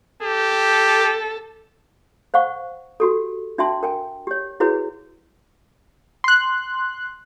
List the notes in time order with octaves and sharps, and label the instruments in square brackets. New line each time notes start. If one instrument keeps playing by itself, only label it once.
[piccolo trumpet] G4 [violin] A4
[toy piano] C5 F5 F#5 C#6
F#4 G4 A4
D4 F#4 E5 G5 A5 C6
A#4 G5 G#5
G4 C#5
E4 F#4 G#4 B4 C#5
[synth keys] C6 F#6